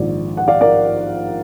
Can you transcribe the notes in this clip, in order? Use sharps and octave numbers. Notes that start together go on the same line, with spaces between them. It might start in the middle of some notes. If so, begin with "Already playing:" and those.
Already playing: A#1 G#2 D#3 D5
F#5
D5 F5
A#4 D5